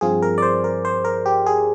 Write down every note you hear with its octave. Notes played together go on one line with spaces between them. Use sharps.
G2 F3 C4 F4 G#4
A#4
D5
C5
A#4
C5
A#4
G4
G#4